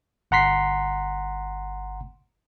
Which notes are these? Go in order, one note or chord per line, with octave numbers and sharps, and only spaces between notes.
G1 F#5 A#5 C6 B6 C7